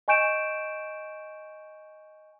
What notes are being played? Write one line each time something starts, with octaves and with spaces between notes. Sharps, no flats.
D#5 G#5 C#6 G6 D7 E7